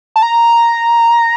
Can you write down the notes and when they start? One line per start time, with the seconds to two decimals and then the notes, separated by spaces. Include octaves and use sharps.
0.16 A5
0.23 A#5